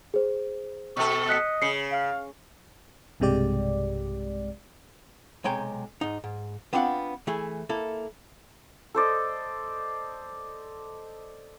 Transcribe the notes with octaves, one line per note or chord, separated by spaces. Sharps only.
G#4 C5
B2 A4 C#6
D#5 F#6 B6 C#7
C#3 C7 C#7
F5
B1 G2 C3 G#3 G4 D5
B1 C3 G#3 C#5 G5 A#5
G#2 D#4
G#2
B3 C4 D4 F4 D#5 F#5
E3 A3 G#4
A#3 E4 A4
A4 C5 D5 D#5